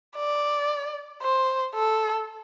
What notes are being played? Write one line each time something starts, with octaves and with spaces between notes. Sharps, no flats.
D5
C5
A4